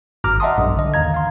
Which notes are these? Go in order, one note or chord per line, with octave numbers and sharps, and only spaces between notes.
G#1 G2 A#5 D6 F6
D#5 E5 F#5 A5 C6 D#6
B1 G2
D3 D#5
D#2 D#3 F5 A#5 G#6
F5 C6